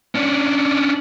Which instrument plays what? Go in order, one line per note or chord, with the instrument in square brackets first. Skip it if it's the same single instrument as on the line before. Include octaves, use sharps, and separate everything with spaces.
[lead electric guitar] C#4 D4